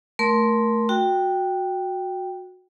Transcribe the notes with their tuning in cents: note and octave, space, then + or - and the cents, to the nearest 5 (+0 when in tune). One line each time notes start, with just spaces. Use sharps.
A3 +0 A#4 +15 C6 +0
F#4 -15 G5 +0